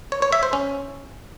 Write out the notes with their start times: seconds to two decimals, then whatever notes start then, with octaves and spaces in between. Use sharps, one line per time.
0.12 C#5
0.22 C#5
0.32 E5
0.43 C5
0.53 C#4